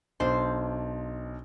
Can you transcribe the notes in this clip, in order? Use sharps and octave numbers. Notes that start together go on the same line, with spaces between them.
B1 D4 C5 C6